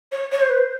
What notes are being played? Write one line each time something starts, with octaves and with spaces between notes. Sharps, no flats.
C#5
C#5
C5
B4
C5